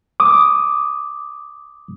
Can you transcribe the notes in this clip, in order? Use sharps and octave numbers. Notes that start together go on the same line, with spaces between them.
D6 D#6